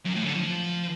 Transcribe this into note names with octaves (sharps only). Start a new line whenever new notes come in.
F#2
A2
D3
F3